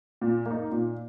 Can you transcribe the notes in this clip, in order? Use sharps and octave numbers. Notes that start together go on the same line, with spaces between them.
A#2
A#3 D#4
A#2